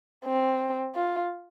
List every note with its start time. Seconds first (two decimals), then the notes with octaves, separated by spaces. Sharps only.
0.26 C4
0.95 F4